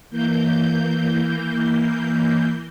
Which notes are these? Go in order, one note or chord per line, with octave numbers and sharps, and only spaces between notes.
E3 A#3 G6